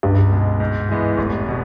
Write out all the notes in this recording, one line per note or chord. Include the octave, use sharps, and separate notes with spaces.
C#2 G2
B2 G#3
G#2
E3 G#3 B3
F1 G#2
A2
B2